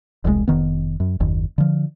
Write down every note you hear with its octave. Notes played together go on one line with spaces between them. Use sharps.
E1 C2 D3 G#3
F1 D#3 B3
F#2
F#1 D#2
D3 F3